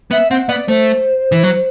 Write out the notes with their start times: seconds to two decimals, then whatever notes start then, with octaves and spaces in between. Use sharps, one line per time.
0.11 B3 E5
0.30 C4 F#5
0.49 B3 D5
0.68 A3 C5
1.32 E3
1.44 F#3